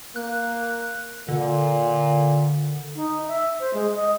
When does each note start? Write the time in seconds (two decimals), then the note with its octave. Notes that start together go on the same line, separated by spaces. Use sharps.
0.16 A#3 F#6
1.28 A#2 D3
2.96 D#4
3.28 E5
3.60 C5
3.74 G#3
3.96 D#5